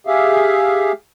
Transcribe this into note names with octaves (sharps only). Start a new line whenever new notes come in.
G4 G#4 E5 F5